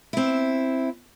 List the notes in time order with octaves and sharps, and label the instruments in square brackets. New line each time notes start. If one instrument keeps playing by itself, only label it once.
[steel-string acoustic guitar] C4 E4